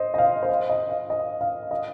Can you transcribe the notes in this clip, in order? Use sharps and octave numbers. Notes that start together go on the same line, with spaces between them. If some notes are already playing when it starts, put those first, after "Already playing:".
Already playing: C5 D#5
D#5
F5
C5
D#5
D#5
F5
D#5
F5
D#5